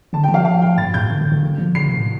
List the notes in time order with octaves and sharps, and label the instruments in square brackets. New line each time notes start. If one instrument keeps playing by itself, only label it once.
[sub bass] D3 [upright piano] A5
[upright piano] G5
[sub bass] F3
[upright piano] F5
F5
G5
[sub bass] G2 [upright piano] A6
[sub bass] A2 [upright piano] G6
[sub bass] D3
D3
D3
D3
F3
[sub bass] D3 [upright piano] C7
[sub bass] C3
A2